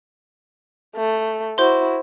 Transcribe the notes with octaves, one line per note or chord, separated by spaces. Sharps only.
A3
E4 F#4 C5 C6